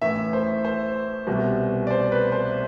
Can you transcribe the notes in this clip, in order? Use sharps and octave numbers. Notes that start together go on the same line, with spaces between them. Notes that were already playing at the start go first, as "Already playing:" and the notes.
A1 A2 E3 E5
C5
C5
C2 B2 G3
D5
C5
B4
C5